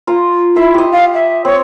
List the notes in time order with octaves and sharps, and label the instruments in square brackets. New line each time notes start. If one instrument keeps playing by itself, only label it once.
[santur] F4 A#5
[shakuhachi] E4 [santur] E5 C6
[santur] G4 D#5
[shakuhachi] F5
E5
[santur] C4 [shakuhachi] C#5